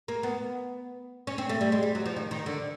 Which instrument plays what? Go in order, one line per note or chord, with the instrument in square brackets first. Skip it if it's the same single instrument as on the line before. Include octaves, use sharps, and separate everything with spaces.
[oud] A#3
B3
C#4
C4
A3
G3
G#3
G3
F#3
F3
D#3
D#3
D3